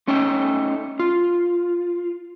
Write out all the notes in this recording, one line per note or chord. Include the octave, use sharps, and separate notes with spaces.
A3 C#4 D#4 G5
F4